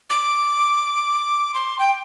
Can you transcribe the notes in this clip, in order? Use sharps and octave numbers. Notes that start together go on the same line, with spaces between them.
D6
C6
G5